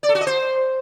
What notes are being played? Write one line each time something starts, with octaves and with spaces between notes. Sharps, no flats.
D5
A4
F#4
D#5
C5